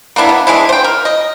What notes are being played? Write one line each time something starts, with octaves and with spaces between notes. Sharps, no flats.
A#3 B3 D4 E4
B3
E3 G#3 D4 E4
C5 G5
A#4
D#5